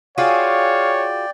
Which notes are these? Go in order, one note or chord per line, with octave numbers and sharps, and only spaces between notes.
F4 F#4 G#4 C#5 D5 F5 G5